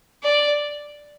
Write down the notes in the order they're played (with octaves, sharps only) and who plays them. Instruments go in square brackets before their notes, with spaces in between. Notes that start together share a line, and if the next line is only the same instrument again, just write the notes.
[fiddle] D5